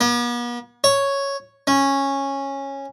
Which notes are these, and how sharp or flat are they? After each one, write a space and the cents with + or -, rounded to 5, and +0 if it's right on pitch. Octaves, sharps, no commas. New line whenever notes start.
B3 -45
C#5 +0
C#4 -10